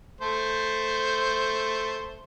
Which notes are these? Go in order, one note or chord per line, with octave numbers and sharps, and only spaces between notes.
A3 C5